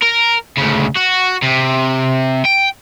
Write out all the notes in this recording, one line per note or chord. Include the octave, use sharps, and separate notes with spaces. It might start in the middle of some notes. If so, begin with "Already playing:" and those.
A#4
D2 C#3
F#4
C3
G5